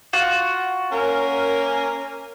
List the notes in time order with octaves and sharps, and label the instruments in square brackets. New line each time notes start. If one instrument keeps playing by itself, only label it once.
[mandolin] F4 F#4
[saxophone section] A#3 C#4 A#4